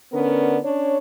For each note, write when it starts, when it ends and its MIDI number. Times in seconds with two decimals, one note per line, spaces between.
0.13 0.58 50
0.13 0.58 59
0.13 0.58 61
0.13 0.58 70
0.13 0.58 74
0.64 0.98 61
0.64 0.98 62
0.64 0.98 73